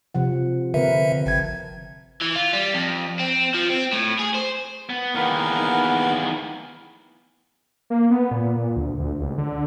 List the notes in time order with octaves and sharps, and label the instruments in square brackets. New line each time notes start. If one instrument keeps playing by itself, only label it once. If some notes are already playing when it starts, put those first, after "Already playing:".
[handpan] C3 F3 F#5
[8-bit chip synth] D3 E5 [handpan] C4 A#4 B4
[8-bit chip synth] G#1 G#6
[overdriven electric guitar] E3
F4
G3
F2
C4
F3
C4
A2
G#4
C5
[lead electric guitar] B3
[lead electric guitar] E2 D#3 [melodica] A#3 B3 A#4
[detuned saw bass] A#3
B3
A#2
A#2
D2
D2
C#2
D3